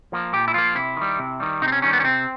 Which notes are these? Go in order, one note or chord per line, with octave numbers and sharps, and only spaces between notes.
F3 A#3
A#2 G4
E4
F3 A#3 F4
C3 E4
D#3 G3
C3
D#3 G3
C3 D#4
C4
C#4
D#3 G3 C#4
B3
C#4
C3 C4